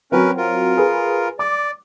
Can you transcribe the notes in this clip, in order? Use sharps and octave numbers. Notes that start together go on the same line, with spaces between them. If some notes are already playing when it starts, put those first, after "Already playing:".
F#3 C4 C#4 A#4 B4
F4 A#4
G#4 B4
D5 D6